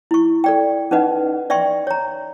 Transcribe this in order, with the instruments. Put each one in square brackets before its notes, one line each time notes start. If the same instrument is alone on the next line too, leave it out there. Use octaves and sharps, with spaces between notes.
[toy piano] E4 C#6
A4 D5 G5
C#4 D#4 B4 D#5 F#5
D5 E5 G5 C6 C#6
C#5 A#5